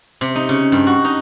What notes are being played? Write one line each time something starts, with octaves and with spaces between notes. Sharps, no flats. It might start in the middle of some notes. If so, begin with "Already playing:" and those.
C3
D#4
C#3
G2
F#4
D#4